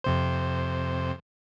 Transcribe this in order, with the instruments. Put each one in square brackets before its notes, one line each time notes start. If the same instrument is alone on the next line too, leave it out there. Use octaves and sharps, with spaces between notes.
[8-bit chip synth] F2 C3 C5